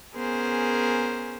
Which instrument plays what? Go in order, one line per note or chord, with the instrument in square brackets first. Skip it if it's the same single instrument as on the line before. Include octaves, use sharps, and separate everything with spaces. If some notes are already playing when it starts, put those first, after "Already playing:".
[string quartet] B3 C#4 G#4 A#4 C5